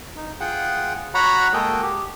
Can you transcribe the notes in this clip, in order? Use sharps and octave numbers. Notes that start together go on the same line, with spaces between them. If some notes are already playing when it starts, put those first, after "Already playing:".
D#4
F4 G#4 F#5 G5
F#4 C#5 F#5 A#5 B5
G#3 A#3 F#4 A4 D#5 G5
G4